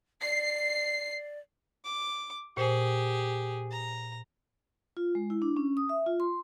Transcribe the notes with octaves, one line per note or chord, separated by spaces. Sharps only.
D5 C7
D6
A#2 G4 G#4 C5
A#5
F4
G#3
E4
D4
C#4
D#6
E5
F4
C6